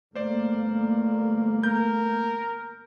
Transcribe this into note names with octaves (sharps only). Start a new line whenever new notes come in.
G1 G2 A3 A#3 C5 D5
A#4 G6